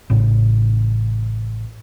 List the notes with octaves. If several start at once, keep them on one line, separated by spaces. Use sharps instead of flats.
A1 A2 C#3